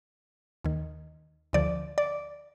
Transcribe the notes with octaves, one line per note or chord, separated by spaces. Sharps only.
D#2 D#3
D2 D3 F3 D5
D5